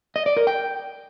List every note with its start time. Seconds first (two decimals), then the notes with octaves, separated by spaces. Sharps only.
0.16 D#5
0.26 D5
0.37 A#4
0.47 G5